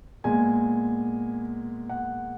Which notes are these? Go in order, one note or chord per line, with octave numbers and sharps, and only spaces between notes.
A#2 G#3 B3 G#5
F#5